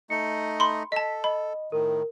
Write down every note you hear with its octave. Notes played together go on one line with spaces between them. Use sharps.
A3 D#4 D#5 C#7
B5 C6
A4 D#5 A5 B6
D#5 B5
A2 D#3 A#4